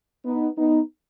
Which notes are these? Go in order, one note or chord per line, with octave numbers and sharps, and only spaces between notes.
B3 D#4
B3 D#4